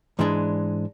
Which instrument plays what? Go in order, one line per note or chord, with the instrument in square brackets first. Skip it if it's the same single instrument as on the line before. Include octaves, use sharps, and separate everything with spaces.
[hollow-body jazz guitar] G#2 E3 G#3 D4